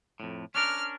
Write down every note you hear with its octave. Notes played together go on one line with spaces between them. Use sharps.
F2 A2
C#4 D4 A#4 F6